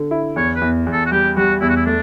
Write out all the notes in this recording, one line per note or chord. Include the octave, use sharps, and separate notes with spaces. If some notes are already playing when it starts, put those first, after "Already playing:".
Already playing: D3
E4
E2 C#5
B4
E2
E2
A4
F#4
G3 G4
G3 F#4
E2 E4
F#4
E4
A3 D4